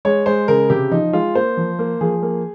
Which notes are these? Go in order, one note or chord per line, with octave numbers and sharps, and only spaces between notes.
G#3 C#5
G#3 C5
C#3 A#4
C3 G4
F3 D#4
G#3 F4
A#3 C5
F3
A#3
F3 G#4
A#3